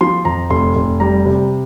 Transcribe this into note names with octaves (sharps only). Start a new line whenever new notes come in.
F3 C6
F2 A#5
F1 C6
F1
G3 A#5
C3